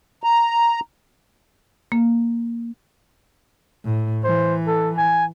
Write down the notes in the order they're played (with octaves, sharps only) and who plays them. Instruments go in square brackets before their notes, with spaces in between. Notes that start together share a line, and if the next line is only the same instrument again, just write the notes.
[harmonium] A#5
[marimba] A#3
[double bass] A2
[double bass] E3 [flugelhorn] C5
[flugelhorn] A4
G#5